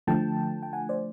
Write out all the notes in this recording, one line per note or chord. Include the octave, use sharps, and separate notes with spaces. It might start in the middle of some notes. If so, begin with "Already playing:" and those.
D3 F3 A3 G5 A5
G5
F#5 G#5
C5 D5